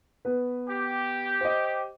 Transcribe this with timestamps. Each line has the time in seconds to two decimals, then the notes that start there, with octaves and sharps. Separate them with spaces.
0.25 B3 B4
0.67 G4
1.41 C5 D#5